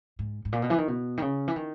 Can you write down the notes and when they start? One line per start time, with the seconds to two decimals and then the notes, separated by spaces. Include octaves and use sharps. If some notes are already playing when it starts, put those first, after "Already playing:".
0.19 G#2
0.45 G#2
0.52 A#2
0.62 B2
0.70 E3
0.78 D#3
0.88 B2
1.17 D#3
1.22 C#3
1.48 E3
1.56 D#3